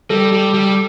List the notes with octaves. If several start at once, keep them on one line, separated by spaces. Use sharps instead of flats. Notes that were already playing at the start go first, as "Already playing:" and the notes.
G3 A4
G3
G3